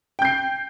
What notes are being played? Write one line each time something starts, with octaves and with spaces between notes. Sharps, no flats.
G5 G6 C7